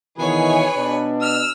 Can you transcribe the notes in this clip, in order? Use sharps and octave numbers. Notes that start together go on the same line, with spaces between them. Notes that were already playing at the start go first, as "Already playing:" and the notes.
B2 D#3 E3 G#4 B4 C#5 G#5
B2 D4
E6 F6